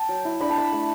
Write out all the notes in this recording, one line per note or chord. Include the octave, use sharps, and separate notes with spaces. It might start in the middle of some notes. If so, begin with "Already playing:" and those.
Already playing: G5 A5
F#3
E4
D4 B5
A5
D4 B5
A3